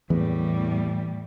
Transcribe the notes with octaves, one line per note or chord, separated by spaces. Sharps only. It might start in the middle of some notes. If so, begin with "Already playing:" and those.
E2 A2 E3 G3 B3